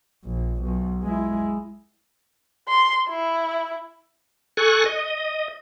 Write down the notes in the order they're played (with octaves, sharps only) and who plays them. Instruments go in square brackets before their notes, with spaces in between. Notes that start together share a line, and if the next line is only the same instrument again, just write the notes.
[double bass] A#1
B1
G#3 E4
[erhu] C6
E4
[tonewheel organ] A4 G#5 C#6 F#6
D#5